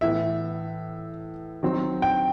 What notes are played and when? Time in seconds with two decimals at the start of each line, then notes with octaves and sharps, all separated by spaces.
0.01 A2 E3 B3 E5
1.63 D#3 F#3 C4
2.02 G5